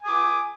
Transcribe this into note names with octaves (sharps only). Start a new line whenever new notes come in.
G#5 D6 D#6